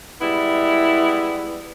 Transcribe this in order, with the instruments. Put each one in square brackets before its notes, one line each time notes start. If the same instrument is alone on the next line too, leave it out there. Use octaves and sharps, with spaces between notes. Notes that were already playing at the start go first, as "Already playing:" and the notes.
[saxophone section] G3 G#3 B3 E4